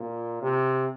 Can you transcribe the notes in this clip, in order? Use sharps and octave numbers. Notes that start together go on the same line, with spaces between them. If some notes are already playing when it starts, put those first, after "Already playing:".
Already playing: A#2
C3